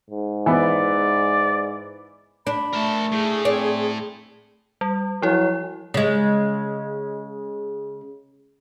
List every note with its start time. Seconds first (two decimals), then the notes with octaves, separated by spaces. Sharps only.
0.10 G#2
0.46 E3 B3 D5
2.47 D4 B5
2.73 A3 A#4 A5
3.12 A2 G#4
3.45 C4 D5
4.81 G3
5.22 F3 F#3 E4
5.94 C#3 G#3